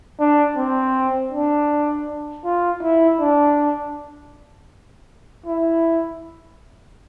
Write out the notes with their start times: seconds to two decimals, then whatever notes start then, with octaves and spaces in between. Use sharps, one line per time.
0.19 D4
0.57 C4
1.32 D4
2.45 F4
2.82 E4
3.20 D4
5.46 E4